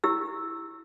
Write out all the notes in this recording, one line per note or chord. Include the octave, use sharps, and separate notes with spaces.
E4 G4 E6